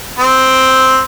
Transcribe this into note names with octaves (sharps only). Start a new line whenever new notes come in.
C4